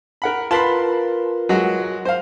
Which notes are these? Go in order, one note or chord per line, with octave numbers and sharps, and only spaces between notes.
A#4 F#5 B5
F4 A#4 B4 A5 B5 C6
F#3 G#3 F#4
C5 F5